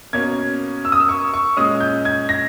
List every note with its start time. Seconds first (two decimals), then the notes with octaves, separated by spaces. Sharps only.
0.13 B2 A#3 C#4 G#6
0.85 E6
0.92 D#6
1.00 E6
1.09 C#6
1.34 C#6
1.57 A#2 G#3 C#4 D#6
1.80 G6
2.05 G#6
2.29 A#6